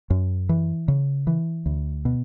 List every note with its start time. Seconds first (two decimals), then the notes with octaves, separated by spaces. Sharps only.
0.10 F#2
0.49 E3
0.88 C#3
1.27 E3
1.66 D2
2.05 B2